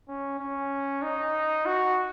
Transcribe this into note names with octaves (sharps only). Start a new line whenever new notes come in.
C#4
C#4
D#4
F#4